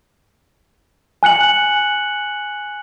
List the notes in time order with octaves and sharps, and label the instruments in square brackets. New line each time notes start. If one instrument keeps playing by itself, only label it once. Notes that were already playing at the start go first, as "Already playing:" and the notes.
[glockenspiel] G#5 F#6 C#7 F#7